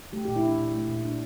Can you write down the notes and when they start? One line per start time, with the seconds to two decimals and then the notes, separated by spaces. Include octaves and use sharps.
0.13 A3 G4
0.25 A#2 G4
0.36 E4
0.44 D4
0.58 A#2
0.74 A3
0.89 A#2
1.04 D4